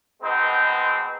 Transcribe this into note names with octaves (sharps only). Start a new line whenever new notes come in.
B2 G#3 B3 C4 D#4